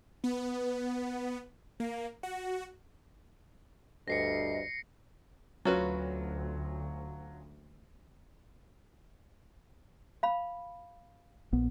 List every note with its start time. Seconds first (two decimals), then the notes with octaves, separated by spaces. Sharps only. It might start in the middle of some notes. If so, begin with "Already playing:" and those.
0.24 B3
1.80 A#3
2.23 F#4
4.08 D2 G2 D#5 A#6 C7 C#7
5.65 D2 F#3 C#4 F4 F#4 B4
10.23 F5 B5
11.52 A#1 B3